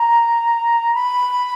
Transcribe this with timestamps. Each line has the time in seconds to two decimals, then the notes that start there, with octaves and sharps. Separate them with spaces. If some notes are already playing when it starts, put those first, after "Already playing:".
Already playing: A#5
0.94 B5